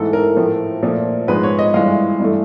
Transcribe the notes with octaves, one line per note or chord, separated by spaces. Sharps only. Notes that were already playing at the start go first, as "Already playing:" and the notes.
Already playing: G#2 E3 A3 A4
A#4
A2 F3 A3
A#2 F3 A3
G#2 F3 G#3 B4
C#5
D#5
G2 E3 G#3 F5
G2 E3 A3